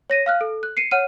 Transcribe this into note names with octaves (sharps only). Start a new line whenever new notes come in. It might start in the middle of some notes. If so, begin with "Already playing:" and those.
C#5 A#6 D#7
F5 F6 F#6
A4
F#6
C7 C#7 D#7
C#5 F#5 F6 D#7